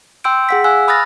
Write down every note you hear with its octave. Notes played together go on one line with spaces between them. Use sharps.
G5 C6 E6 G6 D7
G#4 F#5 B6
F5 G#5 E6 F#6
B5 D#6 F6 F#6 A6 A#6